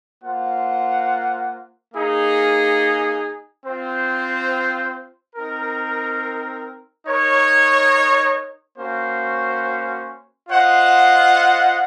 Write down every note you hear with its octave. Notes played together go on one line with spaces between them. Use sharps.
A#3 F4 C5 F#5
A#3 D#4 G#4
C4 F4 C5
C4 D#4 A#4
D#4 A#4 C#5
A#3 C#4 F#4 C5
F4 C5 D#5 F#5